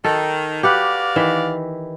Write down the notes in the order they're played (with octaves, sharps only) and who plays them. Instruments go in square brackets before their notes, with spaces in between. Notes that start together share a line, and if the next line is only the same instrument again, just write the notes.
[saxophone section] D#3 [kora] A4
[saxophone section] F#4 D5 F5 [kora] G4 B4 F#5
[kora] D#3 E3 E5